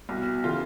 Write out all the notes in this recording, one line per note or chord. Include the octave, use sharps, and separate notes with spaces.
C2 B2
C#3 E3 F4